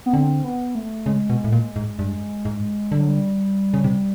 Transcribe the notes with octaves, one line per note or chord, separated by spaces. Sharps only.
B3
D3 C4
B3
A3
C#3 G#3
B2
A2
A#2
G#2
G2
G#2
D3 G3
F#3
G3
C#3
C3